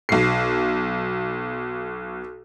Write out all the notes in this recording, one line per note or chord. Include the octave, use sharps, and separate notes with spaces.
B1 C7